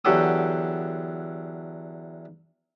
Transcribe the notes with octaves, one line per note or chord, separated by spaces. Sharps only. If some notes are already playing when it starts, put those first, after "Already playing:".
E2 D3 F#3 G4 A4 D#6